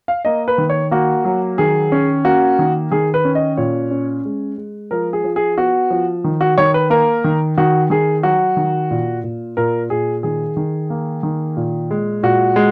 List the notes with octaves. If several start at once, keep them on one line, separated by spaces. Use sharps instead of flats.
F5
A#3 D#5
B4
D#3
C#5
A#3 F#4
F#3
D#3 G#4
C#4
A#3 F#4
D#3
D#3 G#4
B4
C#4
D#5
A#2 C#5
C#4
G#3
G#3
F3 A#4
G#4
F3
G#4
B3 F#4
F3
D#3
F#4
D#3 C#5
B4
A#3 A#4
D#3
D#3 F#4
D#3 G#4
F#3 F#4
D#3
A#2
A#2
A#2 A#4
A#2 G#4
D#3 G#4
D#3
A#3
D#3
A#2
G#3
A#2 F#4
G#3